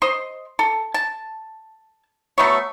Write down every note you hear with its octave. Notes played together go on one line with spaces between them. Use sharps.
C5 D#5 C6
A4
A5
F#3 A3 B3 C#5